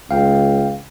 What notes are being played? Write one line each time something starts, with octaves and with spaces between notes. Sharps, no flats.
C#2 F5 G5